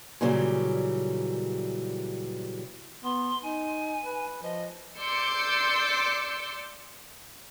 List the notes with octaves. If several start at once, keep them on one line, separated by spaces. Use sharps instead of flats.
A#2 C#3 E3 F#3 G3
B3 C6
D#4 G#5
B4
F3 D#5
D5 C6 D6 E6 G6 C#7